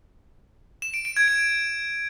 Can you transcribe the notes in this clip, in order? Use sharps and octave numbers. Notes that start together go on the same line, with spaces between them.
E7
D7
D7
G#6
D7